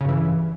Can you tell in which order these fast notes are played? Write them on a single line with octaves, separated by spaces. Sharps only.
C#3 G2 E3